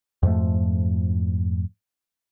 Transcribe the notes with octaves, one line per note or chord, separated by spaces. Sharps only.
F2 G#2 F3 A3